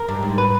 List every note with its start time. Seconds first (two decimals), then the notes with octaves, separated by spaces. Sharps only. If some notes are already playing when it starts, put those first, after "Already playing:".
Already playing: A#4
0.08 G2
0.23 G#2
0.38 B4